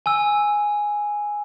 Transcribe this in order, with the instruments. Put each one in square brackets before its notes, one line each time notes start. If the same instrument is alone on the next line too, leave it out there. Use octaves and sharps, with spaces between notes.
[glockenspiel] G#5 E6